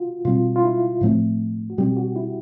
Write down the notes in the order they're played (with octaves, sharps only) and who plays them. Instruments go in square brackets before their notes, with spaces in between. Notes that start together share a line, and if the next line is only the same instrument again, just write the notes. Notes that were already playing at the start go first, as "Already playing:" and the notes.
Already playing: [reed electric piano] F4 F#4
[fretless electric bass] B2 G3 C4 [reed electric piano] F4
[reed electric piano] F4
E4
[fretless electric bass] A2 F3 A3 C4
[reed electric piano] F#4
[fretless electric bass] B2 G3 C4 [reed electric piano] G4
[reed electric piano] F#4
E4